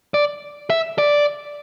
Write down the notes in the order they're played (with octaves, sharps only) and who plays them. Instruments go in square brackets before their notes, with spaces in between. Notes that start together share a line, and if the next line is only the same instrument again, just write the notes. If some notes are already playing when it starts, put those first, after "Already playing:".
[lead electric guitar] D5
E5
D5